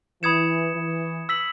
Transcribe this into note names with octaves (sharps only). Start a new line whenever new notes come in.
E3 B5 D#6 G#6 C#7 E7
E3
E6 B6 F#7